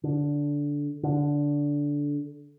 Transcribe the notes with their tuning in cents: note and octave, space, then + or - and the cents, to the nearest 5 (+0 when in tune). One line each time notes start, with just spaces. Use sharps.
D3 -15
D3 -15